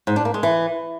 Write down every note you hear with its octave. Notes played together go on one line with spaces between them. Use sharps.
G#2
D4
A#3
G#3
E3